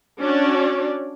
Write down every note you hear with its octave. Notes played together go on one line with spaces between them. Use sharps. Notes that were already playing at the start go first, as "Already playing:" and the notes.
C#4 D4 F#4 C#5 D5